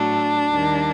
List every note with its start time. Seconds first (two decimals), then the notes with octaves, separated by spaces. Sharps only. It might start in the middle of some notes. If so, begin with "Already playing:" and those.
Already playing: A2 F#3 A3 D4
0.51 D#2 D#3 G3 A#3